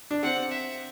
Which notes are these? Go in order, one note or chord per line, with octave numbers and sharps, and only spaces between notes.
D4
C4 F#5
E5